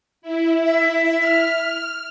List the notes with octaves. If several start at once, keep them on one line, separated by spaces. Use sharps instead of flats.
E4
E5
F6